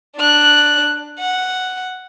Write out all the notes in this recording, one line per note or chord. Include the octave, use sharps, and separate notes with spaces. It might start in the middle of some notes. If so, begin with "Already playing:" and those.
D4 F#6
F#5